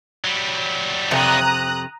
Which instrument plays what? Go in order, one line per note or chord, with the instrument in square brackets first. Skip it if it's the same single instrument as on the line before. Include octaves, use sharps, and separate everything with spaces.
[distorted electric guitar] F#3 G3
[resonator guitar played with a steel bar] F2 C3 [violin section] A#5 D#6 F#6